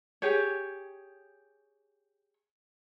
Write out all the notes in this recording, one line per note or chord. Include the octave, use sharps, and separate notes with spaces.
G4 G#4 C#5